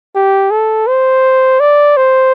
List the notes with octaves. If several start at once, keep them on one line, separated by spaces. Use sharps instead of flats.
G4
A4
C5
D5
C5